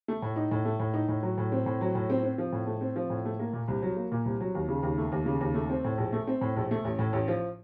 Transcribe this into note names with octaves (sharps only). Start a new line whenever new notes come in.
A3
A2
D#4
A2
A3
A2
D#4
A2
F#3
A2
C4
A2
F#3
A2
C4
C4
F3
A2
A3
C4
F3
A2
A3
A#3
A#2
C2
F#3
A#3
A#2
C2
F#3
D#2
C#3
D#2
A3
D#2
C#3
D#2
A3
C4
A2
A#1
A3
C4
A2
A#1
A3
A1
A2
A1
F3